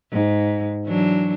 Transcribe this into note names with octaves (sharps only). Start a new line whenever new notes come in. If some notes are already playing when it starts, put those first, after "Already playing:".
G#2
E3 F#3 D4